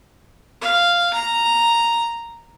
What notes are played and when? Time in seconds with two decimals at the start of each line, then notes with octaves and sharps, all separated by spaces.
0.61 F5
1.14 A#5